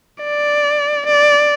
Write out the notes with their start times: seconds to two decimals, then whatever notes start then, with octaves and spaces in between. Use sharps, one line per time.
0.24 D5
1.06 D5